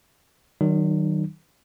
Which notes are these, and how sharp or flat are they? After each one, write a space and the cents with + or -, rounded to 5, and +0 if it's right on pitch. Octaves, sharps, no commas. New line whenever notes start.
D#3 +0 F#3 +30 D#4 -40